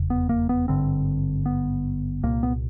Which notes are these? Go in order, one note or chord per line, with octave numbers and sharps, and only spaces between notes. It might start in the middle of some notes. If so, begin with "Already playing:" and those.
Already playing: F1 E2 C#3
B3
A#3
B3
G#1 G2 D3 C4
B3
C2 A#2 A#3
B3